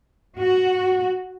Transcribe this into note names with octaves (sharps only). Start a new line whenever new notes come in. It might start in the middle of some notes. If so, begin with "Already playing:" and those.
F#4